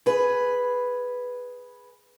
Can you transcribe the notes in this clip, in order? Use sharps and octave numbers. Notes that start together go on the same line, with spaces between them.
G#4 B4